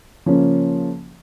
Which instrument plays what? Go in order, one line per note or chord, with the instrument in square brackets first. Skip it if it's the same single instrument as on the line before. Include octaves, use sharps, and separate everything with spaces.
[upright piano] C#3 F3 A#3 C#4